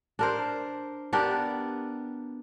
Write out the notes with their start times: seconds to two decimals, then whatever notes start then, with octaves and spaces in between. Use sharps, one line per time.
0.19 D4 A#4 C5
1.13 B3 D4 G4 A#4